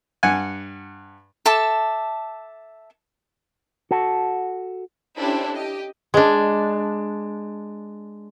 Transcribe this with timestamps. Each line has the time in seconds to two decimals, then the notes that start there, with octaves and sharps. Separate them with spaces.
0.23 G2 F#5 G#5 F#6
1.46 A4 E5 A5 D6
3.91 F#4 A4
5.18 C#4 D4 E4 G4 A4 C5
5.54 G4 D#5
6.14 G#3 D4